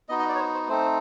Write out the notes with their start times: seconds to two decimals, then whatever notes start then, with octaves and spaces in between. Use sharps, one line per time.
0.09 B3 D#4 F#4 D#5
0.19 D#5
0.29 D5
0.35 C#5
0.39 C5
0.54 C5
0.69 A3 C4 D#4 C5